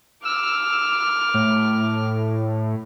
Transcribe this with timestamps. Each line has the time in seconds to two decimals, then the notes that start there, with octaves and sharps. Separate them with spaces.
0.25 D6 E6 F6
1.34 A2